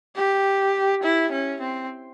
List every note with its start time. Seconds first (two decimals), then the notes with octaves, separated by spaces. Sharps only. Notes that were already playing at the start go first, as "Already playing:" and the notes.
0.16 G4
1.03 E4
1.32 C#4
1.61 C4